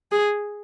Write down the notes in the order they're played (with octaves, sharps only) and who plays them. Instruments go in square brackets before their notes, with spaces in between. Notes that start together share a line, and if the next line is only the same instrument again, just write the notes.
[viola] G#4